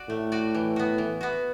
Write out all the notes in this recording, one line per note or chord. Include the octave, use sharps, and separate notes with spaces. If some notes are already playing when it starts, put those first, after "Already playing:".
Already playing: F#4 D5
A2 A3
F#4 D5
E3
B3 F#4
E3
B3 F#4